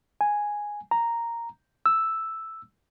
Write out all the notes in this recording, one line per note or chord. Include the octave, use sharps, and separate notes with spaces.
G#5
A#5
E6